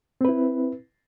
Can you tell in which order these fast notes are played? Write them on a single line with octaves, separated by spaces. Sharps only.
C4 B4 E4